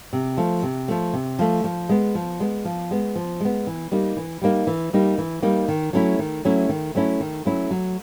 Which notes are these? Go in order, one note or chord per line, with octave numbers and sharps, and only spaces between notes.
C3
F3 A3
C3
F3 A3
C3
F3 A3
F3
G#3 B3
F3
G#3 B3
F3
G#3 B3
F3
G#3 B3
E3
G3 A#3 D#4
E3
G3 A#3 D#4
E3
G3 A#3 D#4
E3
G3 A#3 D#4
D#3
F#3 A3 C#4 E4
D#3
F#3 A3 C#4 E4
D#3
F#3 A3 C#4 E4
D#3
F#3 A3 C#4 E4
F#3